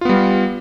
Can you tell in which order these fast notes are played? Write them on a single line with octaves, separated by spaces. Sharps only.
F4 B3 G3